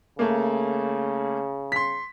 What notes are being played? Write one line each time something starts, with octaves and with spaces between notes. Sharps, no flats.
C#3 A3 A#3
C6 B6